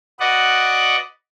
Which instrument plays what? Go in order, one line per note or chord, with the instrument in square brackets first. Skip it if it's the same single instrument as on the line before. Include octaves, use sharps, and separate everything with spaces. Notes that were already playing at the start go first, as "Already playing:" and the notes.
[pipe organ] F#4 B4 D5 D#5 F#5